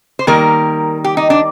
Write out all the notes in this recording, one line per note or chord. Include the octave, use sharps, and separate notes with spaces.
C5
D#3 G3 A#3 A#4
G4
D#4
D4